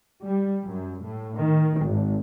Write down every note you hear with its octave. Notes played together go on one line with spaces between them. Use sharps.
G3
F#2
A2
D#3
G#1